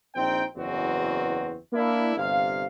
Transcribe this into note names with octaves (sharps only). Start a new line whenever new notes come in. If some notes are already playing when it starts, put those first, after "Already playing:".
A#1 C4 D#4 G5
F#1 E2 E3 C4 F#4
A#3 D4 E4
G1 C3 F5